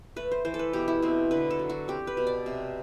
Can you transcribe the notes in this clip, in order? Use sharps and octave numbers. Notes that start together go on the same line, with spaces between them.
A3 B4
C5
E3 C5
A4
B4
B2 G4
E4
B2 C4
D3 B4
A4
F#3
F#4
C4 G4
B4
B2
D5
C3